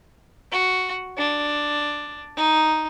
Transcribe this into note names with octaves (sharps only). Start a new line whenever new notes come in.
F#4
D4
D#4